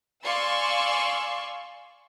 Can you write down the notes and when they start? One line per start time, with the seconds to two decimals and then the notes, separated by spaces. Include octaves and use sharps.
0.24 D5 F5 G#5 C6 C#6 E6